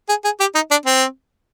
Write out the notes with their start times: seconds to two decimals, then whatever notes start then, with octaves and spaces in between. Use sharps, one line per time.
0.09 G#4
0.24 G#4
0.40 G4
0.55 D#4
0.71 D4
0.85 C4